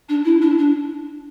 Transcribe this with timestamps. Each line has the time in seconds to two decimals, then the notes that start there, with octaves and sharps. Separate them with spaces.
0.09 D4
0.25 E4
0.41 D4
0.58 D4